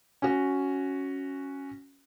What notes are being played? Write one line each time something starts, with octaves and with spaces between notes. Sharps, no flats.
C#4 F#4